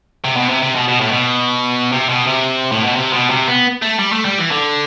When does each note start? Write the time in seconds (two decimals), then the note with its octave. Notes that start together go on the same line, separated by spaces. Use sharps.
0.25 C3
0.36 B2
0.49 C3
0.62 C3
0.75 B2
0.88 B2
1.00 A2
1.11 B2
1.92 C3
2.09 B2
2.27 C3
2.72 A2
2.84 B2
2.95 C3
3.13 B2
3.30 C3
3.48 B3
3.82 A3
3.99 G3
4.12 A3
4.25 G3
4.38 E3
4.51 D3